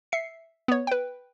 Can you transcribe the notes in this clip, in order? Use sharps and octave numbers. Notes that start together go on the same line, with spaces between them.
E5 C7 C#7
B3 C#5
B4 G5